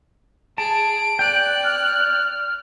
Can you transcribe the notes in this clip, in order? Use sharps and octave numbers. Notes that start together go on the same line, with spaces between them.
G#4 A5 D7
D5 G5 F#6
F6